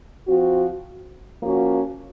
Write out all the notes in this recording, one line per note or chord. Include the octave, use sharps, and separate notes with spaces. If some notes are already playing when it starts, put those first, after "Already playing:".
F3 C4 F#4
F3 A#3 C#4 F#4